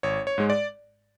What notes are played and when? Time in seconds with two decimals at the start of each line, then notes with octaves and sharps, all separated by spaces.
0.03 G#1 C#5
0.27 C#5
0.38 G#2 G#3
0.50 D5